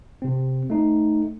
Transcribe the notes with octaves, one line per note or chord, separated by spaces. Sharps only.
C3 C4
A3 D#4